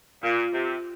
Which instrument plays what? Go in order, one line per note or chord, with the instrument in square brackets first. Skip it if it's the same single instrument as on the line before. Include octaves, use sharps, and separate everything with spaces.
[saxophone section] A#2 [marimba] F4
[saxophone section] C3 [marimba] F4